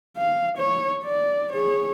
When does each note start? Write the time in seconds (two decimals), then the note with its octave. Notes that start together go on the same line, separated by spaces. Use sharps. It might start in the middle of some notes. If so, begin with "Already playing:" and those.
0.17 F5
0.58 C#5
1.04 D5
1.52 G#4 C#5